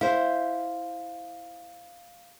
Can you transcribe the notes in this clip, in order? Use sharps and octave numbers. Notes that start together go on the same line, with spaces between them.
E4 C5 F5